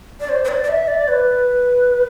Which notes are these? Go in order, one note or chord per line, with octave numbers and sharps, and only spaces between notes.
D5
C5
C5
D5
D5
E5
D5
B4